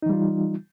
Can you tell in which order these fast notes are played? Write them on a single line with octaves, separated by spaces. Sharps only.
D#4 E3 G3 F4